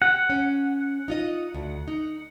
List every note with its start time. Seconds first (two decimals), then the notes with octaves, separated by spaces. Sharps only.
0.02 G4 F#5
0.30 C#4
1.08 D#4 F4 D#5
1.54 D2
1.88 D#4